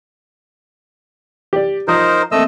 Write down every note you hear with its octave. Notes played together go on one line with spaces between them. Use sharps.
G4 D5
F3 D#4 A#4 C5 D#6
A3 A#3 C4 D#5 E6